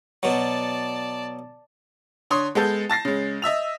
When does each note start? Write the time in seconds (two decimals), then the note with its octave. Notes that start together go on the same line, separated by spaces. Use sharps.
0.23 B2 F#3 D5 A5
2.30 D3 C#5 C6 D#6
2.55 G#3 B3 A4 G6
2.90 A5 A6 A#6 C7
3.05 C#3 G#3
3.42 D#5 E5 E6 F7